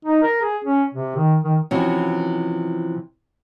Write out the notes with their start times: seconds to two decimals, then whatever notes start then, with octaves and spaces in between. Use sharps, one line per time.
0.05 D#4
0.22 A#4
0.42 G#4
0.64 C#4
0.94 C3
1.16 D#3
1.44 D#3
1.71 C3 E3 F3 C#4 F#4